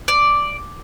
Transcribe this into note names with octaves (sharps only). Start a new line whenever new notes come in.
D5